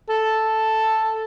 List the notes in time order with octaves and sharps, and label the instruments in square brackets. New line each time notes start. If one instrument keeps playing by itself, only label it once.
[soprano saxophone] A4